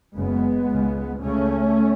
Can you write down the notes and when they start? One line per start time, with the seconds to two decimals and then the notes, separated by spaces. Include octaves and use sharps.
0.16 F#1 F#2 C#3 G#3 B3
0.70 C#2 C#3
1.22 C#2 C#3 A3 C#4